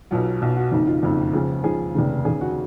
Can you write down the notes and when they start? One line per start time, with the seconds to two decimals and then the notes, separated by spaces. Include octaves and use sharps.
0.11 B1 B2 F#3 F4
0.41 B1 B2 F#3
0.56 F#4
0.72 F#1 F2 D#3 D#4
0.82 D#4
0.87 F4
1.03 F#1 F2 D#3
1.33 C#2 C#3 F3 F4
1.64 C#2 C#3 F3 G#4
1.95 F1 D#2 C#3
2.25 F1 D#2 C#3 G#4
2.41 F#4